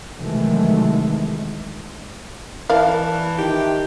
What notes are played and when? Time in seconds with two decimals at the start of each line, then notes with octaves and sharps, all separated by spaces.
0.18 C3 D#3 E3 F#3 G#3 A3
2.70 E3 A#4 D5 E5 F5 A5
3.38 D#3 G4